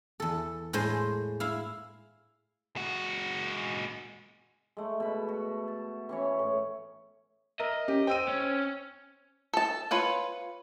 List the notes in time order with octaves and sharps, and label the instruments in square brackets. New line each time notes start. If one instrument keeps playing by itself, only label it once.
[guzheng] E2 A4
A2 G#3 C5
E4 F5
[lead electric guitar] G#3 F#4
[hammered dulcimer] G#3 A3
B2 B5
F#4
A5
E3 C#4 C#5
A2
[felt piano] A#4 [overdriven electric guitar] D#5 [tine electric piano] E5
[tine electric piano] C#4 [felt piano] G4
[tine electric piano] C5 [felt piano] G5 E6 D#7
[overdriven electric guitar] C#4
[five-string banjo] A4 A5
F4 B4 C#5 F#5